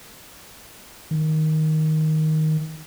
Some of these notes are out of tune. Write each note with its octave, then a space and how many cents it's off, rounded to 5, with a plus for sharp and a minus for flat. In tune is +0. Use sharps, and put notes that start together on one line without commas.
D#3 +5